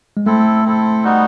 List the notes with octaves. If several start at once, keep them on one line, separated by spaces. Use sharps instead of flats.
G#3
A3 C4 E4 A4
C4 E4 A4
G3 B3 D#4 F#4